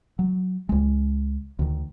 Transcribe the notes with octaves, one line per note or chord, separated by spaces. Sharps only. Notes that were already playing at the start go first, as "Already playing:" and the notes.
F#3
C#2 G#3
D2 D#3